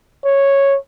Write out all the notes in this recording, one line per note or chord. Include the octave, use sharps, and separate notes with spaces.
C#5